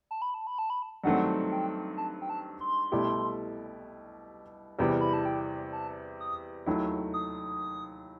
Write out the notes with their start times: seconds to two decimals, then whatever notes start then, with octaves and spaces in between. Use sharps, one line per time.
0.11 A5
0.22 B5
0.34 A5
0.47 B5
0.59 A5
0.70 B5
0.82 A5
1.04 G2 D#3 F#3 A3 C4 F#5
1.51 G5
1.98 A5
2.21 G5
2.30 A5
2.60 C6
2.92 C2 B2 A3 E4 G4
4.79 E2 C3 E3 G3 B3 G5
5.01 B5
5.13 A5
5.25 G5
5.73 A5
6.20 D#6
6.66 D#2 D#3 F#3 A3 E4
7.14 D#6